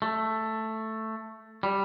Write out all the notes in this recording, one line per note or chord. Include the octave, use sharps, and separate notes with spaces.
A3
G3